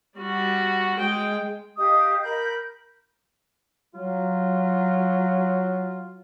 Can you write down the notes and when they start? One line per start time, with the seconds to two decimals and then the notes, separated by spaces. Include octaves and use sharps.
0.19 G3 F#4
0.97 G#3 G5
1.76 G4 D#5 F5 D#6
2.21 A#4 B5 G6
3.94 F#3 F4